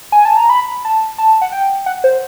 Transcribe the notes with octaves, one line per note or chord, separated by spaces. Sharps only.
G#5
A5
A#5
B5
A5
A5
F#5
G5
F#5
C5